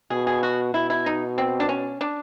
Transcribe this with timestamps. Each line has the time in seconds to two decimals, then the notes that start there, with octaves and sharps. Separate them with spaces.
0.10 B2 G#4
0.27 G#4
0.43 F#4
0.74 B2 E4
0.90 E4
1.06 D#4
1.38 C4
1.60 D4
1.69 C#4
2.01 D4